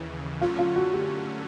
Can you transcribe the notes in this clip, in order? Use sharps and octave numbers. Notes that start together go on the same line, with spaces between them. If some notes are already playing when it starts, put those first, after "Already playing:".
Already playing: D#2 C#3 E3
D3 F#3 A3 C#4 F4
F4
F#4
G4